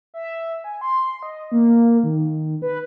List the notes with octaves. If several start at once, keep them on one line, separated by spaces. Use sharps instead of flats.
E5
G#5
C6
D#5
A#3
D#3
B4